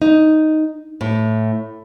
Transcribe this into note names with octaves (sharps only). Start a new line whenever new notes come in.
D#4
A2